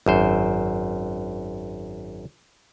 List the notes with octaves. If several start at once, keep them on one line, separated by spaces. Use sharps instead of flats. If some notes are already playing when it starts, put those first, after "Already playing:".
G#1 F#2 C5